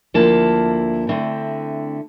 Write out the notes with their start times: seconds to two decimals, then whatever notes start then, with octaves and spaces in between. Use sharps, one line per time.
0.14 D2 D3 F3 A#3 E4 A5
1.07 D3 A3 C4 E4